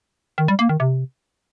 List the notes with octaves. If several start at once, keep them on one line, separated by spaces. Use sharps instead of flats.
D#3
G3
A#3
D#3
C3